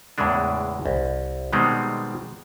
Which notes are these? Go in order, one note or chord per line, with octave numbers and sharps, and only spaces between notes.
E2 A2 C#3 E3 G#3 D4
C2
B2 D#3 G3 G#3 B3 C4